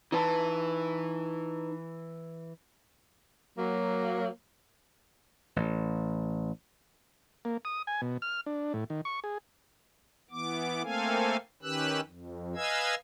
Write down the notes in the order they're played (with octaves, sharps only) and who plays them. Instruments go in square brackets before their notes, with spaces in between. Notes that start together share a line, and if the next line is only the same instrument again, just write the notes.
[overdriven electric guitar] E3 [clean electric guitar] D#4 B4 A5
[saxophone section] F#3 A#3
[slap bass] A1
[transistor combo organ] A#3
D#6
G#5
B2
F6
D4
A2
D#3
C#6
G#4
[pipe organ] E3 B3 D6
A3 A#3 C4 A4 F5 G#5
D#3 C#4 G4 B4 E6 F#6
F2
B4 D#5 F5 G#5 E6 G#6